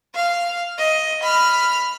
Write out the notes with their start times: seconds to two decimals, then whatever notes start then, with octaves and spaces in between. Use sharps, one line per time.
0.15 F5
0.79 D#5
1.23 B5 F6